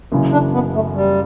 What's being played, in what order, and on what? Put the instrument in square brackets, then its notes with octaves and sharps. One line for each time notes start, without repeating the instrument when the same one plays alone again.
[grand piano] F#1 F#2 C#3 E3
[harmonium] D4
B3
A3
G3